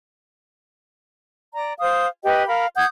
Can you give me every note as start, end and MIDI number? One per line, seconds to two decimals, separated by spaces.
1.53 1.73 74
1.53 1.73 82
1.79 2.07 72
1.79 2.07 77
1.79 2.07 87
2.24 2.45 67
2.24 2.45 71
2.24 2.45 75
2.24 2.45 79
2.47 2.67 70
2.47 2.67 77
2.47 2.67 83
2.76 2.86 78
2.76 2.86 87
2.76 2.86 91
2.76 2.86 92